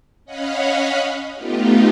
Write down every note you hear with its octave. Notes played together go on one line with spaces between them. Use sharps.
C#4 C#5 D#5 F5 F#5 B5
A3 B3 D#4 F4 G4